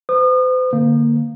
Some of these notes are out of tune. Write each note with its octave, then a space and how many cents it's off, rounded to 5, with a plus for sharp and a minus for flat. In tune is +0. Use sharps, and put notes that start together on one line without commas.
C5 -45 D#6 -40
D3 +15 A#3 +0